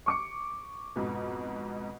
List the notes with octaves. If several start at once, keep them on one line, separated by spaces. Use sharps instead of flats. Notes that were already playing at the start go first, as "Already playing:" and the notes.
C#6 D6 C#7
F2 G#2 B2